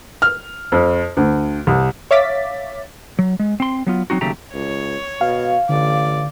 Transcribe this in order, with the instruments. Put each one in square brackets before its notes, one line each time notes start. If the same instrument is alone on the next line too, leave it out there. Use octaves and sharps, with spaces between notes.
[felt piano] F6
F2
D2
C2
[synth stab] C#5 E5 F5 D6 A6 B6
[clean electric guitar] F#3
G#3
C4 C6
F#3 B3 F4
F#3 C4 D#4 F#4
D#2 C#3 F#3 A3 G4 A#5
[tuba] C#2 [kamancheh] C#5
[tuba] B2 [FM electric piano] F5
[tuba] A1 [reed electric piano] D3 [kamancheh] D5